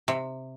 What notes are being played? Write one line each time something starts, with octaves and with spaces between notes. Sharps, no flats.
C3